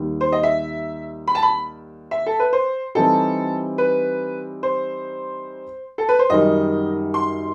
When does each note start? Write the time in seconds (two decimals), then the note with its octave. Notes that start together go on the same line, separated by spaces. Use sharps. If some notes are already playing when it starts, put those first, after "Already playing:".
Already playing: D#2 D#3 G3
0.21 C5
0.32 D#5
0.43 E5
1.28 B5
1.35 A5
1.43 B5
2.11 E5
2.26 A4
2.40 B4
2.53 C5
2.95 E3 G3 C4 D#4 G4 A4
3.78 B4
4.63 C5
5.98 A4
6.09 B4
6.19 C5
6.30 F#2 D#3 G3 D#5
7.14 C6